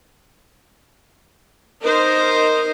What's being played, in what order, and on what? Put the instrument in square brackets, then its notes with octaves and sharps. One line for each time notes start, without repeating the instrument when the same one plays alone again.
[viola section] D#4 A#4 C5 D#5